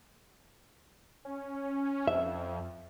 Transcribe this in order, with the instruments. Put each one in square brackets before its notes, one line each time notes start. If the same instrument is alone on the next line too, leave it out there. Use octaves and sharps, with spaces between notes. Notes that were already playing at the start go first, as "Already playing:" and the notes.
[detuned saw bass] C#4
[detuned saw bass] F2 [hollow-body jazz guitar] E5